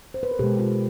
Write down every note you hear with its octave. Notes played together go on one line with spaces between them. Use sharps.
C5
B4
A#4
B2 G#3 G4 A4
F4 G4